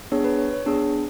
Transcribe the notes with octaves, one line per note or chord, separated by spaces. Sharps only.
B3 D4 G#4 C#5
B4
C#5
C#5
B3 D4 G#4